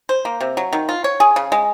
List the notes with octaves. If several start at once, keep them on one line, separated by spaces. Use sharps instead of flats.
C5
A#3
C3
F#3
D#3
F4
C#5
G#4
C#3
G#3